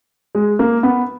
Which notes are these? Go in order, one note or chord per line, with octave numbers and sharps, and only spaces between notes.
G#3
A#3
B3